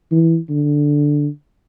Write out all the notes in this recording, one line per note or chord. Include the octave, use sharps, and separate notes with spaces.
E3
D3